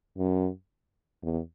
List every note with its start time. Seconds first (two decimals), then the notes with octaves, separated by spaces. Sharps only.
0.18 F#2
1.23 E2